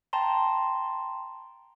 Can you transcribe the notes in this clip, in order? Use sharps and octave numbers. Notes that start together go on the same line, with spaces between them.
G5 A5 A#5 C6